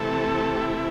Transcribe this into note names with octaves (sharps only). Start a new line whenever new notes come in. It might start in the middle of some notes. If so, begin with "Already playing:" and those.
Already playing: C3 E3 A3 A4
G4
E4